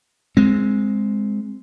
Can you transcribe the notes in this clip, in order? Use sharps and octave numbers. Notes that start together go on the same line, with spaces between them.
G#3 C4